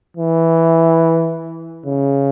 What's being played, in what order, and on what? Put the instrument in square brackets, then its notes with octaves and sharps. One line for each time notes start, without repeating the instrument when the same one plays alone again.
[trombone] E3
C#3